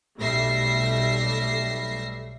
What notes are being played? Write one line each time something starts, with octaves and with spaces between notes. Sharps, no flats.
B1 G3 A3 E5 A#6 C7